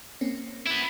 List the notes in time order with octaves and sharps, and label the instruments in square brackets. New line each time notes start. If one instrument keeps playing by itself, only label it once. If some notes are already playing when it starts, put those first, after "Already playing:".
[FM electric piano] A#3 C4 C#4
[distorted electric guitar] B3 E4